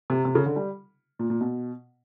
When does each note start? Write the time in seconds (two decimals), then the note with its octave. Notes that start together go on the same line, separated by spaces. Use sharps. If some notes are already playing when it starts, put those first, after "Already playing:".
0.10 C3
0.25 C3
0.35 C#3
0.46 D3
0.56 G3
1.19 A#2
1.30 A#2
1.41 B2